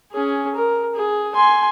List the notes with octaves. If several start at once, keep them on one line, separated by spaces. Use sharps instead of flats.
C#4 G#4
A#4
G#4
G#5 C6